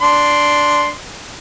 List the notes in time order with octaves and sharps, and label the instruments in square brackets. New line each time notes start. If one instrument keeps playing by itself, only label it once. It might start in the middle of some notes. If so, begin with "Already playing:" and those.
[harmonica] D4 C6